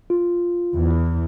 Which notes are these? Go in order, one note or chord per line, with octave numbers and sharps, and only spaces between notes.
F4
E2 E3